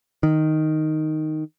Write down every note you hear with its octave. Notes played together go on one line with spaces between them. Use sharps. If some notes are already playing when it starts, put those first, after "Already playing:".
D#3